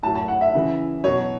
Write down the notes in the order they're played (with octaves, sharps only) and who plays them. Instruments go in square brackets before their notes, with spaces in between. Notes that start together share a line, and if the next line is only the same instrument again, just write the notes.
[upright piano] A2 F#3 A5
A5
F#5
E5
C#3 E3
B2 F#3 C#5